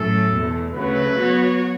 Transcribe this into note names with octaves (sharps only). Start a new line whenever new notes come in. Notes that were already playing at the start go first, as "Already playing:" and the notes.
Already playing: A2 F#3 C#4 A4
E2 B2 A3
D2 C#3 F#3 A3 B4
F#3 B3 F#4 C#5